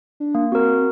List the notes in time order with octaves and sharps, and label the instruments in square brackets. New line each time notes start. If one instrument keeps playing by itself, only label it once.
[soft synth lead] D4
[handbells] A#3
[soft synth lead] C4 [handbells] F#4 A#4